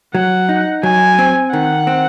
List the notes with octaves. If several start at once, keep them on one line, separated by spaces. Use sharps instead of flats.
F#3 F#5
D#4
F#3 G#5
C4
D#3 F#5
C4